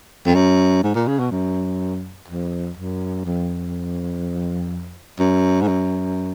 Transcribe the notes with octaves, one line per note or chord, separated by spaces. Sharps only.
F2
F#2
G#2
A#2
C#3
B2
F#2
F2
F#2
F2
F#2
G#2
F#2